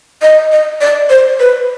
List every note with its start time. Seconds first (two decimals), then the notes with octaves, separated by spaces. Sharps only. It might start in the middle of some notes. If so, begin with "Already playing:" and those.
0.22 D#5
0.52 D#5
0.81 D5
1.10 C5
1.40 B4